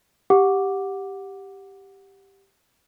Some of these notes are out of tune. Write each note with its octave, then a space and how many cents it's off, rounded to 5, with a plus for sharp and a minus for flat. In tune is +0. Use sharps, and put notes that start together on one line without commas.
G4 +0 F#5 -15 D6 +0